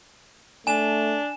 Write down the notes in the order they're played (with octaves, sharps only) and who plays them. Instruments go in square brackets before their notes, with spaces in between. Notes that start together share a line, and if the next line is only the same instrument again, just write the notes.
[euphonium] A3 [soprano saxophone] D4 [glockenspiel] G#5 E7